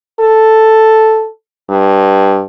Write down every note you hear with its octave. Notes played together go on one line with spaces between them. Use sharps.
A4
G2